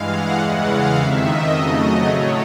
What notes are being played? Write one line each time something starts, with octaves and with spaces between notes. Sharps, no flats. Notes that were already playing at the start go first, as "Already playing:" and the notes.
Already playing: G2 E3 G#3 F5
F#5
E2 C#3 E3 G#3 F#5
F5
F2 C3 D#3 E5
D#5
F2 C#3 F#3 A3
A2 F#3 A3 C#5